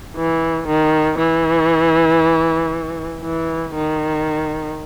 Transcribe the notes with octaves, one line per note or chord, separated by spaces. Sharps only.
E3
D#3
E3
E3
D#3